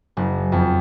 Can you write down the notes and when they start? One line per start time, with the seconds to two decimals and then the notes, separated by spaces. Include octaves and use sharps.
0.17 F#1
0.52 F2